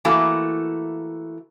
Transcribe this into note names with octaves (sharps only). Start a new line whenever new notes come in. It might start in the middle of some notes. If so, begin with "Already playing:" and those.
E3 A3 A#3 E4 F#4